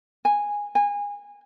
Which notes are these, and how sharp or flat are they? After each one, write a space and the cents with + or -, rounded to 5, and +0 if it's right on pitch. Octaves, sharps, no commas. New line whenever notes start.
G#5 -10
G#5 -25